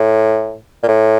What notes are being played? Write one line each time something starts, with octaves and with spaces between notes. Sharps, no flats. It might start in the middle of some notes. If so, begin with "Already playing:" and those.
Already playing: A2
A#2
A2